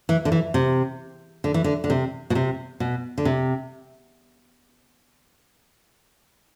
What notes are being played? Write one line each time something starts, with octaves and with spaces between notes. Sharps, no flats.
E3
D3
E3
C3
D3
E3
D3
D3
C3
B2
C3
B2
D3
C3